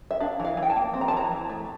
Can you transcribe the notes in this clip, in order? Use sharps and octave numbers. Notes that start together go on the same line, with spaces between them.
E5
D4 F5
E3 F5
E3
G5
A5
A#3
C4
A#5
A5
E3 A#5
E3
A3